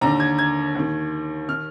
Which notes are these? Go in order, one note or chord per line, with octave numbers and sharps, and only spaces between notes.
D#2 D3 A#5
G#6
G#6
D#2 D#3
D#3 F6